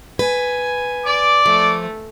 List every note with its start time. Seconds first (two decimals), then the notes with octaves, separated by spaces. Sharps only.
0.19 B4 G#5
1.06 D5 D6
1.46 F3 A3